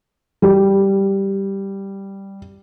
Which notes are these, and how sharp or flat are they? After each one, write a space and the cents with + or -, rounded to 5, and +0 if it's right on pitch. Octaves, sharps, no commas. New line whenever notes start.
G3 +0